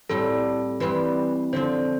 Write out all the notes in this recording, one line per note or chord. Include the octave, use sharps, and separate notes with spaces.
A2 G3 C4 G4 A4
E3 G3 C4 G4 B4
D3 F3 C4 C5